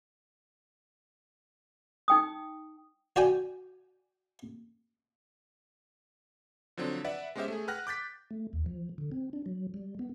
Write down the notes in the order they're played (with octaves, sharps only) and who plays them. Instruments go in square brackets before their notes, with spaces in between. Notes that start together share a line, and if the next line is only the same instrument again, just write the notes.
[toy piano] D#4 G5 D#6
[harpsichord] F#4 D5 G5 G#5
[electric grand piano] D3 F3 F#3 C4 D4
B4 D5 E5 F#5
G#3 B3 C#4 G4 C5 E5
A3 G#4
B4 F#5 G5 F6 F#6 A#6
D6 G6 A6 B6
[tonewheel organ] A3
D#2
F3
D3
C4
D4
F#3
G3
B3